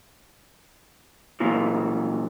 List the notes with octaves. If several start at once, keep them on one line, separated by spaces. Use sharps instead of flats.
A#2 E3 F3